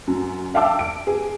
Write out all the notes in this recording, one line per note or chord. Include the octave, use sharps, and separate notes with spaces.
F#2
E5 F5 G5 A5 D6 E6
D7
G#4